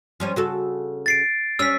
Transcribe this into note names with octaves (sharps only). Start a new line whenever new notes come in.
F3 G3 C#4
C#3 F#4 A4
A6 C7 D7
G3 C#4 E6 B6